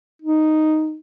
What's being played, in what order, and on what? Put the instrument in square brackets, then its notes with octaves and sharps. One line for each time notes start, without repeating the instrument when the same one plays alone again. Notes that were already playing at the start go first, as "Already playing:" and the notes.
[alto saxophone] D#4